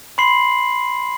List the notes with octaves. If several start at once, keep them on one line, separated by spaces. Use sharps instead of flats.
B5 C6 C7 F#7